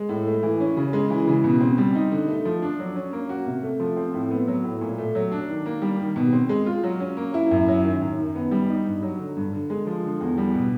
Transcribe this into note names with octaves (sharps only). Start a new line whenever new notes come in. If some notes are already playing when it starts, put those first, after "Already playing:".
Already playing: G#3
A2
A3
E3
C#4
C#3
G#3
E3
C#3
B2
C4
G3
D#4
D3
A3
F3
D4
F#3
C#4
A#3
F#4
C3
A3
F3
C4
A2
B3
F#3
A2
A#2
A3
F#3
D4
D#3
A#3
G3
D#3
B2
C4
G#3
F4
F#3
C#4
A#3
E4
F#2
F#3
D#3
F#2
D#3
B3
G3
D#4
G2
F#3
D3
G2
D3
G#3
F3
D3
E2
G3
B2